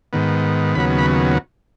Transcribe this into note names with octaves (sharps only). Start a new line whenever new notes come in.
G#2 D#3 B3
D#2 C#3 F#3 B3 B5
B5